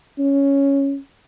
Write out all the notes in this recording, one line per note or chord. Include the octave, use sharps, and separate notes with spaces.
C#4